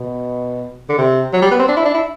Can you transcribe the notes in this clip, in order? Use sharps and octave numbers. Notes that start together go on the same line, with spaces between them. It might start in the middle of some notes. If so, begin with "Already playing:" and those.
Already playing: B2
D3
C3
F#3
G3
B3
C4
D4
E4
D4
E4